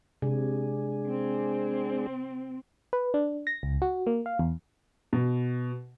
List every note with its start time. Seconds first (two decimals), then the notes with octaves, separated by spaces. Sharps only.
0.22 C3 G#3 D4 G#4
1.08 C4
2.93 B4
3.14 D4
3.47 A#6
3.63 C#2
3.82 F#4
4.07 A#3
4.26 F5
4.39 E2
5.13 B2